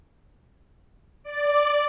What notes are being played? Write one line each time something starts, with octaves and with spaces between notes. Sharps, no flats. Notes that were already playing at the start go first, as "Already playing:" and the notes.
D5